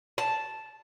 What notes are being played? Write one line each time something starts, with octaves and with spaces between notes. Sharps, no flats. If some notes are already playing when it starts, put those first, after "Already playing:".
A5